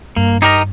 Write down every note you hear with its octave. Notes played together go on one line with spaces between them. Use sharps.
G2 A#3
D#4 G4 A#4 D#5